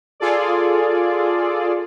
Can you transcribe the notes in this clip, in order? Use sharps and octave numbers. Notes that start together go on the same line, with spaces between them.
F4 G#4 A4 D5